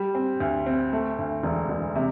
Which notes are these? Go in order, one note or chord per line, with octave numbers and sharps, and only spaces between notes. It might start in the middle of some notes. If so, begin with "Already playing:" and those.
Already playing: G3
C4
D2
C4
A3
D2
E1
E1
C3